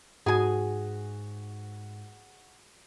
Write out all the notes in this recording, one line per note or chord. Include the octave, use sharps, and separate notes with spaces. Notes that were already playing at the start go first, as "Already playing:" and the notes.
G#2 F#4 G#4 G#5